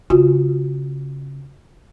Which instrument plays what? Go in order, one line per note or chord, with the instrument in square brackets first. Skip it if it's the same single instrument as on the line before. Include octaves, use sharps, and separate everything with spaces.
[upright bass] C#3 [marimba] F4 F#4